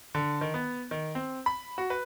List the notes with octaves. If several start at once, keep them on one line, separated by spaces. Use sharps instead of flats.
D3
D#3
B3
D#3
C4
B5
F#4
B4